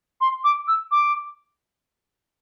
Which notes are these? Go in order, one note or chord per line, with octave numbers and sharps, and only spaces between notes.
C6
D6
E6
D6